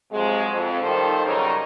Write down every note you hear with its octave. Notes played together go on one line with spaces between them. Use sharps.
C3 F3 F#3 G#3
F2
D#3 F3 G3 D#4 A4 C5
C#3 F#3 G3 C#4 D#4 A#4